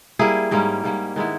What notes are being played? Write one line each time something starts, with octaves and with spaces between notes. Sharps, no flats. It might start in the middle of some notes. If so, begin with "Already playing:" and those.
G3 A#3 E4 G#4
G#2 G3 A#3 C#4
G#2 G3 A#3 C#4
D#3 G#3 B3 E4